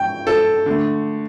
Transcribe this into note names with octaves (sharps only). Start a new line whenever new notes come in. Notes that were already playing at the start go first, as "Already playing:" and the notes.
Already playing: G5
A4
D3 A3